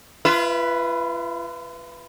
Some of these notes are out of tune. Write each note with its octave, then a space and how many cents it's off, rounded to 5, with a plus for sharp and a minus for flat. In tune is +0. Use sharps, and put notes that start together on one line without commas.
F4 -40 B4 +0 E5 +0